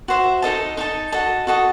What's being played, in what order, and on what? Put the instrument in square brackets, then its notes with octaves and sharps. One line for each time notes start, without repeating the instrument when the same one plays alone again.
[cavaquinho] F#4 C5 E5
D#4 A4 D#5 A5
D#4 A4 D#5 A5
F#4 A4 D#5 A5
F#4 A4 D#5 A5